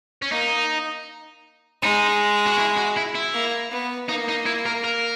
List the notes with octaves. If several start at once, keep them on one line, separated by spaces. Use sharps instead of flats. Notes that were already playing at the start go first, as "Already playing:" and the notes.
C#4
A#3 D#4
G#3 D#4
F#4
E4
F#4
E4
E4
A#3
B3
A#3 D#4
D#4
E4
A#4
A#4